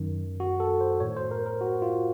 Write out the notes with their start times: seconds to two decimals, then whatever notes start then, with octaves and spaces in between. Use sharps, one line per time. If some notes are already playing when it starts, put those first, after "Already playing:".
Already playing: F#2 D#3
0.40 F#4
0.60 A4
0.81 C5
1.00 A2 C#5
1.17 C5
1.31 A#4
1.46 A#4
1.61 F#4
1.82 F4